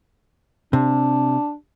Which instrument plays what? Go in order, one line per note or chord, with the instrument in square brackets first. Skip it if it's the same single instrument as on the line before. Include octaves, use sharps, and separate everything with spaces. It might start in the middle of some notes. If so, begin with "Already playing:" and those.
[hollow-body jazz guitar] C3 [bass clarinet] D4